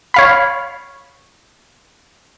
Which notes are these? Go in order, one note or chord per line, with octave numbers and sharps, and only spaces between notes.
C#5 F5 B5